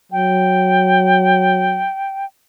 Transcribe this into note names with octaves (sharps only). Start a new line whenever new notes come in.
F#3 G5